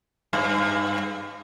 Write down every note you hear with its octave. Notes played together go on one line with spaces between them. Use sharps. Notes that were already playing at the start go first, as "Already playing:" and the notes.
G2